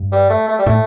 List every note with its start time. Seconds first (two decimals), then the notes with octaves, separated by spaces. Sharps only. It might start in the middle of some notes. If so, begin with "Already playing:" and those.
Already playing: G2
0.12 G3
0.30 A3
0.48 A3
0.59 G3
0.66 A2 A3